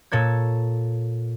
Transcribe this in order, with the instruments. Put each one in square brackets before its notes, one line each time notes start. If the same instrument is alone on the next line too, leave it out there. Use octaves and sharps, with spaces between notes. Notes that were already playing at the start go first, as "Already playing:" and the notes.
[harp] A#2 A4 C#5 G#6